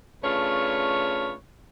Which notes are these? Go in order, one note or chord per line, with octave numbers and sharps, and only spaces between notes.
C#3 A3 D4 F4 B4 C#5